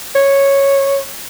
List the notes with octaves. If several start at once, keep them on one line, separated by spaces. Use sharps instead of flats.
C#5